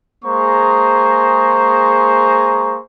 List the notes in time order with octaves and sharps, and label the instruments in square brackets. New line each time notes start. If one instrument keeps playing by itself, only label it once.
[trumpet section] G#3 A#3 G#4 C5 A#5 C#6